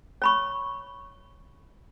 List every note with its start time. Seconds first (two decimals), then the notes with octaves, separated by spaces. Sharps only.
0.22 C#5 B5 C#6